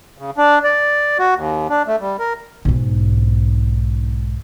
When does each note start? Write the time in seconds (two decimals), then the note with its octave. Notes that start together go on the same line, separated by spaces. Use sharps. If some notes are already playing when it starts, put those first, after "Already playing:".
0.18 C#3
0.38 D4
0.64 D5
1.19 F#4
1.35 D#2
1.69 D4
1.87 A3
2.00 G3
2.19 A#4
2.65 B1 G#2